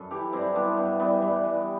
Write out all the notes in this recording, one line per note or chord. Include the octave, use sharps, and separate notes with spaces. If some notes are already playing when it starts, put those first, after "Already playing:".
Already playing: F#2 A4 B4
E3 E4 G4
G2 C4 E4
E3 B3 D4
G2 B3 D4
E3 G3 B3
G2 G3
E3